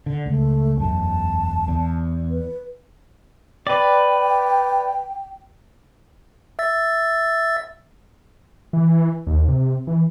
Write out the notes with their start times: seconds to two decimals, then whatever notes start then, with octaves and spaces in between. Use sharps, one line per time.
0.06 D3
0.26 C#2 A3
0.80 E1 B1 F#2 A5
1.68 E2
2.31 B4
3.67 B4 D5 G5
6.59 E5 E6 A6
8.73 E3
9.27 D#2
9.48 C3
9.87 E3